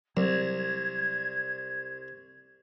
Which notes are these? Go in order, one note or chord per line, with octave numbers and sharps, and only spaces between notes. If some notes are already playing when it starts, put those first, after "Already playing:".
C2 F#3 G#6